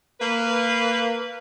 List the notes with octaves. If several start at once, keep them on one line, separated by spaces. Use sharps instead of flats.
A#3 B4